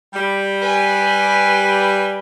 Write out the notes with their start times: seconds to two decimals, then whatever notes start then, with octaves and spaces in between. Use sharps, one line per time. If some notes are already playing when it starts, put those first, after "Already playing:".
0.13 G3
0.61 B4 G#5